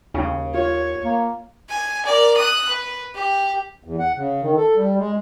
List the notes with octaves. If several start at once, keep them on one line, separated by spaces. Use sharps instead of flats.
D#2 C#3
F4 C#5
A#3
G#5
A#4 D5
D#6 F#6
B4
G4
E2
F#5
C#3
D#3
A4
G3
G#3